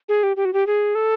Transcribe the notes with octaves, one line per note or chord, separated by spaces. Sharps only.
G#4
G4
G4
F#4
G4
G#4
A4